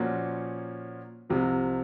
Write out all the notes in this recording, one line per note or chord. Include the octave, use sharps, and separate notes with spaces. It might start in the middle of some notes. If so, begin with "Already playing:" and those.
Already playing: A#2 F3 A#3 C#4 F#4
C2 C3 F3